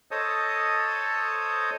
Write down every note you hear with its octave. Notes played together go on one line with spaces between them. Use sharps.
A4 C5 C#5 D#5 A5 D#6